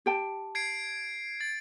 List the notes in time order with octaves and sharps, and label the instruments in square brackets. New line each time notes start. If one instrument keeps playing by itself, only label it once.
[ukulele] G4 G5 A5
[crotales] G#6 C7 D7
A6